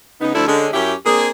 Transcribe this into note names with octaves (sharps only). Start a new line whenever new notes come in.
C#3 B3 D#4
D2 F3 D4 E4 A4 D5
D3 G#3 C#4
F#2 C#4 E4 G4
A#3 C4 D4 G#4